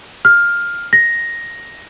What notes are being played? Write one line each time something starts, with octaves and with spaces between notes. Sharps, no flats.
F6
A#6